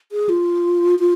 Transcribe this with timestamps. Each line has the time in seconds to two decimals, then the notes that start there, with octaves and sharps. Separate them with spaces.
0.12 G#4
0.29 F4
0.99 F4